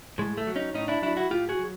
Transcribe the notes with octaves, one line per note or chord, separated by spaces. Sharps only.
A2 G#3
A3
F#3
C#4 D#4
A2 C#4 D#4
D4 E4
F#3 D4 E4
E4 F#4
A2 F4 G4
F#4 G#4
F#3